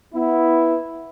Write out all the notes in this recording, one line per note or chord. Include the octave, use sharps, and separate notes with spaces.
B3 E4